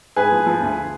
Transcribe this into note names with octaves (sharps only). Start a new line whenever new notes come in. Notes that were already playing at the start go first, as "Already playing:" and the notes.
G#2 G#4 B4
F3
F3
D2